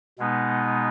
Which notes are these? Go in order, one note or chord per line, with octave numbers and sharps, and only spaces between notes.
B2 G#3 B3 D#4